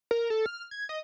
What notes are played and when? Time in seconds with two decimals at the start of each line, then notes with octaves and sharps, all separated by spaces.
0.11 A#4
0.30 A4
0.46 F6
0.71 G#6
0.89 D#5